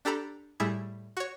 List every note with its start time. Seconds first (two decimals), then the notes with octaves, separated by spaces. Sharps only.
0.05 D4 G4 A4 A#5 B5
0.60 A2 G3 E4 G#4
1.17 F#4 C#5